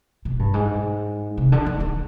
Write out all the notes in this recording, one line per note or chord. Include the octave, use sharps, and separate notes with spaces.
B2
G2
G#2
C3
D3
D#3
D#3